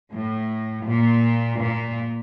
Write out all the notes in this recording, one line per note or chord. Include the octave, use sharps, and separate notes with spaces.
A2
A#2
A#2